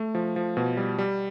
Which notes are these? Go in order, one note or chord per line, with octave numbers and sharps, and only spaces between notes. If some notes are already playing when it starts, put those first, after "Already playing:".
Already playing: A3
F3
F3
B2
G3
G3